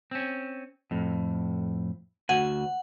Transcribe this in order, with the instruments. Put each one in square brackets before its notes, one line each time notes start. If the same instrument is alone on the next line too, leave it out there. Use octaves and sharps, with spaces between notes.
[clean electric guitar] C4 C#4
F2 A2
[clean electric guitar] D2 F#4 G#5 [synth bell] F#5